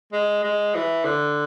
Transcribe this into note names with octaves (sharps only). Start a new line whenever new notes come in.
G#3
G#3
E3
D3